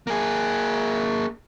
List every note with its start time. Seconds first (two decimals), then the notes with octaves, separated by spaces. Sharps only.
0.07 A#3 G#4